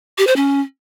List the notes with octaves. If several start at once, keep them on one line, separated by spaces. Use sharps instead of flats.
G4
C5
C#4